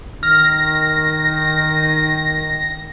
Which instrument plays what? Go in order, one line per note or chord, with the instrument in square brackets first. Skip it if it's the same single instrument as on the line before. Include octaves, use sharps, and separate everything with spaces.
[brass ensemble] D#3 [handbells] F6 [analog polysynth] A#6